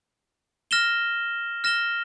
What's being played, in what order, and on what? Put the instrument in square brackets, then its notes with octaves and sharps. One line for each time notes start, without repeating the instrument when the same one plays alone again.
[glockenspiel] F6 A#6 E7 G7
F6 A#6 E7 G7